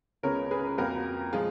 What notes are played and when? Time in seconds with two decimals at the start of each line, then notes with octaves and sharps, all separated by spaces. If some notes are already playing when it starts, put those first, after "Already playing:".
0.23 C#2 C#3 G#3 B3 A#4 C#5
0.51 G#4 B4
0.78 F2 F3 A#3 F#4 A#4
1.33 A#2 F3 G#3 F4 G#4